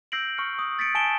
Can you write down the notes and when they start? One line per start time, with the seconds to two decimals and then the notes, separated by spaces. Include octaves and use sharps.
0.12 E6 G6 A#6 C7 D7 F#7
0.37 C#6 F6 C#7
0.59 D#6
0.79 A6 B6 C#7 D7
0.95 G#5 A5 D7 E7 G7